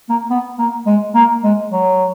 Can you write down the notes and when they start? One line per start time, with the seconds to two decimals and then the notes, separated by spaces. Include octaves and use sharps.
0.09 A#3
0.30 B3
0.58 A#3
0.86 G#3
1.15 A#3
1.44 G#3
1.71 F#3